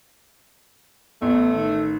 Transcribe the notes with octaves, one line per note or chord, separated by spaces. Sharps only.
A1 A3 B3
D#3